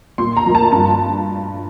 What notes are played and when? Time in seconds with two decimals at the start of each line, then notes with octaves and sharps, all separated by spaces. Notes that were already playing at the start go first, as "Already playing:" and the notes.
0.18 A#2 C6
0.37 A#5
0.46 F3 A#3
0.55 A5
0.72 G2 A5